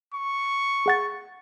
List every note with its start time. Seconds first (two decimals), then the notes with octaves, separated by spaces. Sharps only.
0.14 C#6
0.86 G#4 F#5 A6